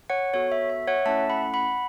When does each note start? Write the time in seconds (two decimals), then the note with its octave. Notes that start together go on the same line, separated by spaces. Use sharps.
0.10 C#5 F#5
0.34 B3 F#4 A4 C#5
0.52 E5
0.70 E5
0.88 C#5 F#5
1.06 A3 C#4 E4 A4 E5 A5
1.30 F#5 B5
1.54 F#5 B5